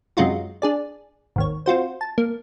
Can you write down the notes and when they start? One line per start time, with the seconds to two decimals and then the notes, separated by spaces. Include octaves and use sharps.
0.17 F#2 C3 G#3 D#4 F4 F#4
0.62 D4 G#4 D5
1.36 G#1 D#2 C#5
1.66 C4 F4 F#4 C5
2.01 A5
2.18 A#3